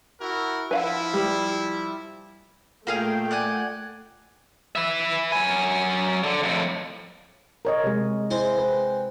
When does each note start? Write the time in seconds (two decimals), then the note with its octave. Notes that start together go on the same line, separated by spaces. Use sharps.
0.21 E4 F#4 A#4
0.71 F3 E4 B4 F5 F#5
1.14 G3
2.87 A#2 A3 A#3 G#4 F5 G5
3.31 D5 F#5 G#5
4.75 B4 E5
5.32 F#3 G#5
6.24 D3
6.43 F2 A2
7.65 A#4 C#5 D#5
7.84 C3 G#3
8.31 G#3 C4 E4 C5
8.58 B4